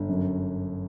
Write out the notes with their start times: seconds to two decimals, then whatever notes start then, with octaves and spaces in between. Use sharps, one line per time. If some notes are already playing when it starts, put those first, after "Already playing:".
Already playing: G1
0.09 F#2